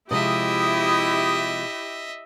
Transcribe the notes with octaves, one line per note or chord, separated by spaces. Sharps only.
C3 F3 G#3 E4 G4 D#5 E5 D#6